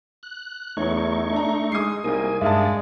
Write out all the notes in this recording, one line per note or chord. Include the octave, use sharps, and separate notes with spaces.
F#6
E2 A3 D#4 C#5 C#6
D4 A#5
G#3 D#6 C7
C2 A#3 D#4 G#4 G#5
G2 G#3 D5 E5 F5 A5